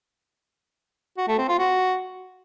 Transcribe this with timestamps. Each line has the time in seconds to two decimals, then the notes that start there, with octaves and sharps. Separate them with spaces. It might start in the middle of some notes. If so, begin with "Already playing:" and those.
1.17 F#4
1.28 A3
1.38 C4
1.49 F4
1.59 F#4